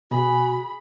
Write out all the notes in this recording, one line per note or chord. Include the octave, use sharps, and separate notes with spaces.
B2 F#4 G#4 B5